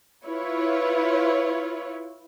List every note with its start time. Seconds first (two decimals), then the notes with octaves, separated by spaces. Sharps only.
0.25 E4 F4 B4 C#5